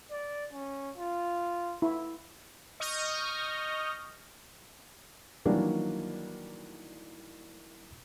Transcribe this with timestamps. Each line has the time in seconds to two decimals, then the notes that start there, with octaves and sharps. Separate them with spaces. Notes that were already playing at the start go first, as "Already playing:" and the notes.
0.11 D5
0.53 C#4
0.98 F4
1.82 E4
2.80 D#5 C#6 D#6 F6 G6 A#6
5.46 D#3 E3 F#3 G3 A#3 D4